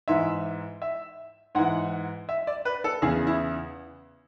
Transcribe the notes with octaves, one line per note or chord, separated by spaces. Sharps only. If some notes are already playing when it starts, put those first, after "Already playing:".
G#2 E3 E5
E5
G#2 E3 F#5
E5
D5
B4
A4
E2 C#3 E3 G#4
E4